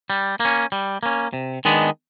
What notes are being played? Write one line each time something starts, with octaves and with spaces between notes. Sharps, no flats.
G3
A#3 C#4
G3
A#3 C#4
C3
D#3 G#3 B3 D4